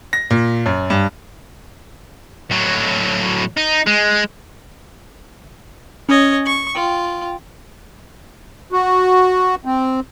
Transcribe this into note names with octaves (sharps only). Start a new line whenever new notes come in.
A#6
A#2
F#2
G2
A2 F#3
D#4
G#3
C#4 C#5 D#5
C#6
F4 G5
F#4
C4